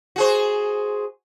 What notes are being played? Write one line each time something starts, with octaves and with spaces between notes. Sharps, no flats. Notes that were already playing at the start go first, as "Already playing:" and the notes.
F#4 G#4 C5